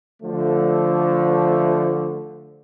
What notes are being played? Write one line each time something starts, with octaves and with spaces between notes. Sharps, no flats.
D3 F3 A3